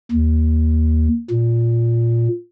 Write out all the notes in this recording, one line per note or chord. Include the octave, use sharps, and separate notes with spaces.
D#2
A#2